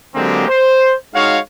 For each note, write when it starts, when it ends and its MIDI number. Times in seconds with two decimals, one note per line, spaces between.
0.15 0.47 50
0.15 0.47 54
0.15 0.47 56
0.15 0.47 58
0.15 0.47 60
0.15 0.47 67
0.48 0.95 72
1.15 1.38 56
1.15 1.38 63
1.15 1.38 66
1.15 1.38 73
1.15 1.38 77